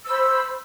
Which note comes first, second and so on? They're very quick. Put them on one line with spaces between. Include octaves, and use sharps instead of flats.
E6 C5 B5